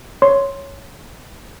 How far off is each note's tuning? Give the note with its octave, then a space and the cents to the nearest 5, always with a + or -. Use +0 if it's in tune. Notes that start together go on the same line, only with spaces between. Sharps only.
C#5 +0 C6 +0